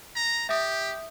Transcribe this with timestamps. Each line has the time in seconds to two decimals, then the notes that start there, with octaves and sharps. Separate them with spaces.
0.16 A#5
0.49 G4 E5 D#6